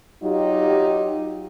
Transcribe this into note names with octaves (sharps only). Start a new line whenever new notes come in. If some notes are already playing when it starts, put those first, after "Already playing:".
F#3 D#4 F4 G4